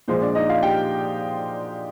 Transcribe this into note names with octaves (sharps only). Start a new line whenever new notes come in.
A#2 F3 G#3 C5
D4 D5
D#4 D#5
F4 F5
G4 G5